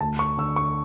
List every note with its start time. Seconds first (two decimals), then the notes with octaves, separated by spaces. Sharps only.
0.01 D2 A5
0.19 C#6
0.38 D3 E6
0.56 C#6